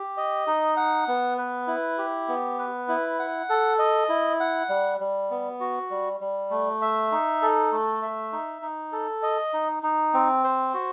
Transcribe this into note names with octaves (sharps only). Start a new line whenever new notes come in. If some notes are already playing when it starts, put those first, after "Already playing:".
Already playing: G4
D#5
D#4
F#5
B3
B4
E4
G4
B3
B4
E4
F#5
A4
D#5
E4
F#5
G3
G3
B3
F#4
G3
G3
A3
E5
D#4
A4
A3
E5
D#4
D#4
A4
D#5
D#4
D#4
C4
C5
F#4